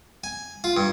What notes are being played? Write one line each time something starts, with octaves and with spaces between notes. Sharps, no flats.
G#5
F4
G2